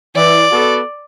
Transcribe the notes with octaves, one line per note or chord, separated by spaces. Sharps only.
E3 D5
B3 F#4 A4